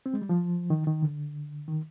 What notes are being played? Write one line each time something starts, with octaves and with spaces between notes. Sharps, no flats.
C4
G#3
G3
F3
D#3
D#3
D3
D#3